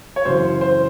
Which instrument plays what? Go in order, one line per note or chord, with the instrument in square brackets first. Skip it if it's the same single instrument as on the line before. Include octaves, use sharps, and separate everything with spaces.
[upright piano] C#5
F#2 C#3 E3 C5
C5